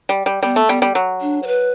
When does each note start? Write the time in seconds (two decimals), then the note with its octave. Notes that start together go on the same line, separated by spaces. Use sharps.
0.09 G3
0.26 G3
0.43 G3 B3
0.56 A3
0.69 G3 B3
0.82 G3
0.95 F#3
1.21 D4
1.43 C5
1.47 B4